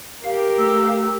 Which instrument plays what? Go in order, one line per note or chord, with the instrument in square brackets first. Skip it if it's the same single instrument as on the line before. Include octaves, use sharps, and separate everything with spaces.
[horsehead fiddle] G4 A#4 [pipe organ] F5
[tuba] A3 [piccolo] E6